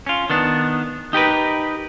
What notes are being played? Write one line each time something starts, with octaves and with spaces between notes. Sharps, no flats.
C#4 F4
D#3 B3 D4
D#4 G4 A#4 B4